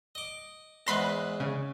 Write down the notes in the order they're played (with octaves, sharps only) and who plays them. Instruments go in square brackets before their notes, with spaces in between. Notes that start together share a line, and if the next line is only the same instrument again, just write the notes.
[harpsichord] D#5 D6
[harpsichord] E2 G#2 B4 [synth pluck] B5 C6 A#6
[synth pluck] C#3